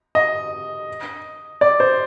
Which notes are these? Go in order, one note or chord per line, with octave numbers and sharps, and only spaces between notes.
D#5
D5
C5